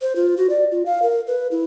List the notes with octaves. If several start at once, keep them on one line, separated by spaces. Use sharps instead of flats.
C5
F4
F#4
D5
F4
F5
A#4
B4
E4